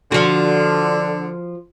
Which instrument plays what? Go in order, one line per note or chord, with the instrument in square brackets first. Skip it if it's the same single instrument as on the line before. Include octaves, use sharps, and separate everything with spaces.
[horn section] D3 [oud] F3 F#4